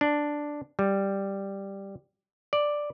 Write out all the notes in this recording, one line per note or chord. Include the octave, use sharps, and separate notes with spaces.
D4
G3
D5